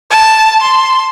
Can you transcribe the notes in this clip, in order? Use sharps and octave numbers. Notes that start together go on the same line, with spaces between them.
A5
C6